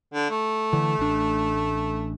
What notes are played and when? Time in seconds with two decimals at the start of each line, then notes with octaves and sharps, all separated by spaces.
0.13 D3
0.30 A3
0.73 D3 E3
0.99 A1 D4